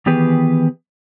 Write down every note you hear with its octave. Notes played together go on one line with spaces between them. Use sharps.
D#3 E3 B3 G4 G#4 B4